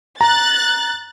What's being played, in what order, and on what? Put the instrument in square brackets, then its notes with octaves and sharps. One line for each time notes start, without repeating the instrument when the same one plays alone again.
[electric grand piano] A#5 [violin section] F#6 A6